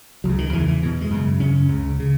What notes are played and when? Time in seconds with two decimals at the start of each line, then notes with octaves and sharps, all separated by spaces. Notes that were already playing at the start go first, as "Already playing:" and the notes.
0.24 C#2 C#3 F#3
0.38 D#3
0.53 E2 C#3 E3
0.68 E3
0.82 E2 B2 E3
1.01 G#3
1.10 F#2 C#3
1.39 F#2 C#3 C#4
1.68 C#2 C#3
2.00 C#3